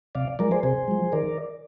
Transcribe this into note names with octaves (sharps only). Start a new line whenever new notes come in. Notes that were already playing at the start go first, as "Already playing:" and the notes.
C3 D5 F5
F3 G#3 A#4 D5
G#4 C5
C3 G#4 C5
F3 G#3
D#3 A#4 D5